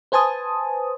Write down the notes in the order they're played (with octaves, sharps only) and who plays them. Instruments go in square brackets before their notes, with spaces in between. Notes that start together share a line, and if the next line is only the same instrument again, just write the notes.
[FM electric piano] B4 C5 G#5 A5 D#6